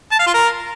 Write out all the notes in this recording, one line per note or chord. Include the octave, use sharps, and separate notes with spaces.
A5
F5
F4
A#4